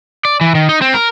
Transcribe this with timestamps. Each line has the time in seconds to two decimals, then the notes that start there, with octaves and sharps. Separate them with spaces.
0.25 D5
0.41 E3
0.55 D#3
0.69 D#4
0.82 C4
0.94 A#4